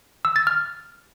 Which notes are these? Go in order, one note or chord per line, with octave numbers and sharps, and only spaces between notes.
E6
A6
F6